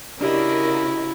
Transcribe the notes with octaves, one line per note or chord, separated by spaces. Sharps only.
C#3 D4 E4 F#4 G4 A#4 D5 D#5